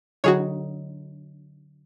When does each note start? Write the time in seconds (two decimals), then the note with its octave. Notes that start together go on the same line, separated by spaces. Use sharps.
0.24 D3 F#3 D#4 F#4 G#4 C#5